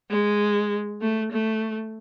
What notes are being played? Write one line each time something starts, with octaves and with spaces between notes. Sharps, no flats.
G#3
A3
A3